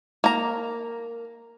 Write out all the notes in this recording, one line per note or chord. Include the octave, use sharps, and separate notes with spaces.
A#3 A#5